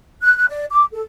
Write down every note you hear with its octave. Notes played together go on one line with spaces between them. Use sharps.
F#6
F#6
D5
D6
A4